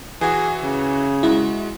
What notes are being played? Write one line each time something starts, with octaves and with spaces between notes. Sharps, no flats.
E3 F#4 G#4
C#3
G#3 E4 F#4